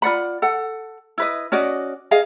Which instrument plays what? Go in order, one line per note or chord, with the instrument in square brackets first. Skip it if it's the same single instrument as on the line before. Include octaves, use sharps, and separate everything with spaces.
[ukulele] F4 D5 F#5 B5
A4 F#5
E4 B4 D#5
C#4 F#4 D5 D#5
G#4 D#5 F5